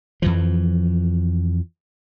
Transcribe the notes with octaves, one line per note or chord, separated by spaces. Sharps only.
F2 E3 F3